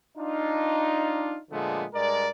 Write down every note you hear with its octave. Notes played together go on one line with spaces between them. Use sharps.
D4 D#4 F4
A#2 D3 F3 G#3 A3 B3
G2 G#3 A#4 D5